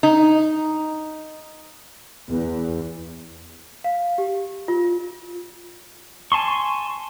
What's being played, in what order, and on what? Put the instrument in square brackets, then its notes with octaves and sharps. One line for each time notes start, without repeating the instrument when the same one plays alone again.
[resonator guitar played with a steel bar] D#4
[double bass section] E2
[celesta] F5
G4
F4
[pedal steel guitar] G#5 A5 C6 C#6